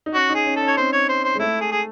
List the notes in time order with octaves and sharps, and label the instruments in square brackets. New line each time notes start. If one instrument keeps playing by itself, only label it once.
[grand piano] D#4
[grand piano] C#4 [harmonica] F#4
[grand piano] D#4
[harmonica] G#4
[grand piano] C#4
[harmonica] A4
[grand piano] C#4
[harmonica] C#5
[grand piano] C4 [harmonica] C5
[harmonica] C#5
C5
C5
[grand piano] G#3
[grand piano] A3 [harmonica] E4
[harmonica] G#4
G#4